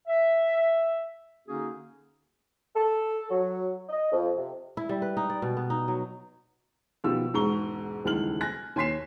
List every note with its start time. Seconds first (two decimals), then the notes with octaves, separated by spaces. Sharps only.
0.07 E5
1.47 D3 A#3 C#4 D#4 F#4 G#4
2.75 A4
3.30 F#3
3.89 D#5
4.11 F2
4.36 C3
4.77 E4
4.89 G3
5.02 B4
5.17 D#4
5.30 D5
5.42 B2
5.57 B3
5.70 D#4
5.88 F#3
7.04 B2 D#3 F3 G4 E6
7.34 E1 G#2 A#5 C#6 G7
8.04 D#1 C#2 D#3 E3 F6 F#7
8.41 G#5 F#6 A#6
8.76 D#2 G#5 C6 B6 C7 E7